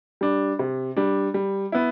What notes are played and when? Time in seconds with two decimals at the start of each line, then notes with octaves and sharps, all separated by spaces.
0.21 G3 D4
0.59 C3
0.96 G3 D4
1.34 G3
1.72 B3 E4